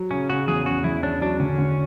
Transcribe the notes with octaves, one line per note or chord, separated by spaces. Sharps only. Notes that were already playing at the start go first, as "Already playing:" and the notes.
Already playing: F#3
C#3 C#4
C#3 F#4
E2 G#4
C#3 F#4
E2 E4
C#4 D4
F#3 D4
D3 C#4
D3